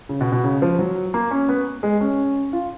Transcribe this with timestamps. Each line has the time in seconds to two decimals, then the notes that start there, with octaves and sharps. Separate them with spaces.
0.09 C#3
0.21 B2
0.32 B2
0.44 C#3
0.62 F3
0.79 F#3
1.14 A#3
1.31 C#4
1.48 B3
1.83 G#3
2.01 C#4
2.53 F4